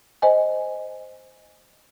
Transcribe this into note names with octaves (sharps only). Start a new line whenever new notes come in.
C5 D#5 G#5